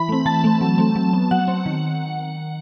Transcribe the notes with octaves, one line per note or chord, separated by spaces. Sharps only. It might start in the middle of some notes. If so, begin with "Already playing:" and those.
Already playing: E3 B5
A3 C4
E3 A5
A3 C4
F#3
A3 C4
F#3
B3
F#3 F#5
C4
D#3